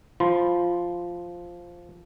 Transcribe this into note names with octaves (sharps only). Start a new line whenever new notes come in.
F3 F4 C6